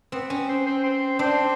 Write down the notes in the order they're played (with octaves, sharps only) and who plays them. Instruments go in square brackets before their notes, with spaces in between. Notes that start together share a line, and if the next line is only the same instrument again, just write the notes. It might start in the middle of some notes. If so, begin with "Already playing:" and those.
[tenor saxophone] B3 [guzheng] C4
[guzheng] C#4
[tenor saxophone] C4
C4
C4
[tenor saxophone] C4 [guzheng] D4